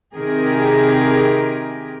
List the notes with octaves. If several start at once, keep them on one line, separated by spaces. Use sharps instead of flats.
C3 D#3 G4 G#4 A#4